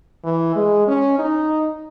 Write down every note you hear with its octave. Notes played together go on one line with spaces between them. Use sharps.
E3
G#3
C#4
D#4